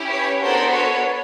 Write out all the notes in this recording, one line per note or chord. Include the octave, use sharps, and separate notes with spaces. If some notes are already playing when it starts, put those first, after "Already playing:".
Already playing: C#4 E4 G4
B4 C#5
B3 D4 F#4 A4 A#4 C5
B4 C#5